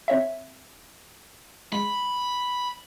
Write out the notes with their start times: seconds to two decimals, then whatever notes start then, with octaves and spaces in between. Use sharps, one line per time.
0.08 C4 C#5 E5
1.72 G#3 B5